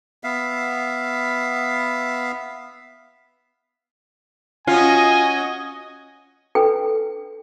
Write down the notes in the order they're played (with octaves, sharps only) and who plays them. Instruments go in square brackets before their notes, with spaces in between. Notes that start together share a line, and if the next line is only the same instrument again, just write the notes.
[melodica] B3 E5 F5
[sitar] C#4 [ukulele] F4 [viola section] F#4 D#5 [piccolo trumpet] G#5
[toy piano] D4 A4 B4 G5 G#5